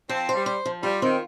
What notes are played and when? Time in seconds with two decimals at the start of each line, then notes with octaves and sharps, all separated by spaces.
0.09 F3 C4
0.29 C5
0.34 G3
0.46 C5
0.66 F3
0.83 G3 F4
1.01 D#3 C4